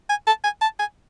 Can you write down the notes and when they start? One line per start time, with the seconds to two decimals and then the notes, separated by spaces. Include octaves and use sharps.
0.09 G#5
0.27 A5
0.44 G#5
0.61 A5
0.79 G#5